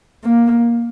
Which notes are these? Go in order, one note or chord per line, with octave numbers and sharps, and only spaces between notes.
A#3